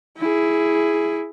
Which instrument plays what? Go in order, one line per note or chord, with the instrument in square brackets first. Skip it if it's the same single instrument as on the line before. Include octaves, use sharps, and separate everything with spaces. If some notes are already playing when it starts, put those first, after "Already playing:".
[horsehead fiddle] E4 G#4